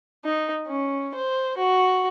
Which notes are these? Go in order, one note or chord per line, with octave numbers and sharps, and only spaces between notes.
D#4
C#4
C5
F#4